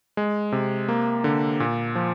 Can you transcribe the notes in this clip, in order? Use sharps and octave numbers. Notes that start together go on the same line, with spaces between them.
G#3
C3
A#3
D3
A#2
F3